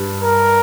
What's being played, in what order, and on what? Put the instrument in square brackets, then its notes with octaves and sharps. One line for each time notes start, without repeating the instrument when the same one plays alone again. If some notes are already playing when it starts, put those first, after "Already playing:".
Already playing: [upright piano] G2
[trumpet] A#4